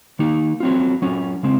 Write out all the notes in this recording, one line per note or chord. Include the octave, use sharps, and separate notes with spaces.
D#3 A#3 D#4
F#3 C4 F4
F#3 C#4 F4
C#3 G#3 C4